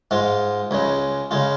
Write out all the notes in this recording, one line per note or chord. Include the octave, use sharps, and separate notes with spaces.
G#2 G#3 F4
C#2 C#3 G#3
C#3 G#3 F4